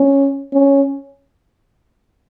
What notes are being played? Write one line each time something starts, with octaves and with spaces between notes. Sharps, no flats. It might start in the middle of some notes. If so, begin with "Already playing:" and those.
Already playing: C#4
C#4